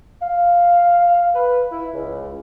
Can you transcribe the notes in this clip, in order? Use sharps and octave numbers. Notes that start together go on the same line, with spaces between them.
F5
B4
E4
C#2